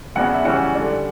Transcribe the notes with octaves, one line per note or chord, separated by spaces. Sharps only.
C#3 F#3 B3 D4 F#5
E5
C#3 E3 G3 C#4 F#5
D3 G3 D4